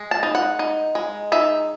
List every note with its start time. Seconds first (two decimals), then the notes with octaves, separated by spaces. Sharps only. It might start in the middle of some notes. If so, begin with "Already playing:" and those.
Already playing: G#3
0.11 A5
0.23 D#4
0.35 F#5
0.59 D#4
0.95 G#3
1.32 D#4 E5